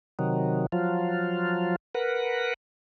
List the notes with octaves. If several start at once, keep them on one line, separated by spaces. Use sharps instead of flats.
C3 D#3 F#3
F3 F#3 F4
A#4 B4 F#5